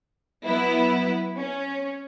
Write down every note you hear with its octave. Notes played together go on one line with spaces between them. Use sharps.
F#3 B3 E4 B4
C#4